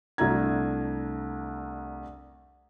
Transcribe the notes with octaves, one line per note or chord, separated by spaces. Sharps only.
C2 A3 D4 A#5 G#6